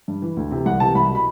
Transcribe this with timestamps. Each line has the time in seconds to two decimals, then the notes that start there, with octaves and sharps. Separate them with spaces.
0.08 G2
0.22 E3
0.37 D2
0.51 C3 E3
0.66 C2 F#5
0.80 C3 E3 A5
0.95 C2 B5
1.10 B2
1.15 B5